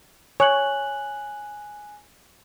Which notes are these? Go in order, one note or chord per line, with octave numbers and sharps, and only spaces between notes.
C#5 G#5 F#6 F#7